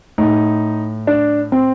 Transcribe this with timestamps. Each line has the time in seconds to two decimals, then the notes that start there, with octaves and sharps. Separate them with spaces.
0.18 A2 D#4
1.07 D4
1.52 C4